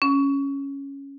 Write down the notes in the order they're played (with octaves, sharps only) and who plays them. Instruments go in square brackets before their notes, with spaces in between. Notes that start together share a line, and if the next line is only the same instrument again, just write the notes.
[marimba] C#4